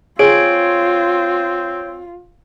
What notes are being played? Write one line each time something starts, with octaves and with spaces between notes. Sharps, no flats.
C4 F4 G#4 C#5 D7